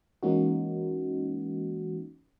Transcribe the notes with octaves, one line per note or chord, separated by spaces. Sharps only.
E3 G#3 A#3 C#4 D#4 F#4